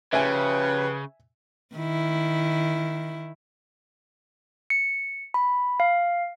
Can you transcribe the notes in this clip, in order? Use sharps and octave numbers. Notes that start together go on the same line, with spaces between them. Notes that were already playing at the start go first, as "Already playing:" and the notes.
C#3 F3 G4 B4 C#5 E5 G#5
D#3 E4
C#7
B5
F5